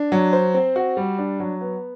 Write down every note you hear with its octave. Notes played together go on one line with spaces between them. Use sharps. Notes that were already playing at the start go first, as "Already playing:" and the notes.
Already playing: D4
F#3
C5
C4
F#4
G3
D4
F#3
B3